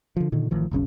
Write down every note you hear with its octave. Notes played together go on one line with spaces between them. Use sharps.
D3 F3
A#2 D3 D#3
A1 D#3 F3
F1 B1 C#3 C#4